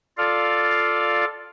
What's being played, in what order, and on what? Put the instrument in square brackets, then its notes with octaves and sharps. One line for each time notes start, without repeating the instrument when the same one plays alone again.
[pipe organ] F4 A4 D5 F5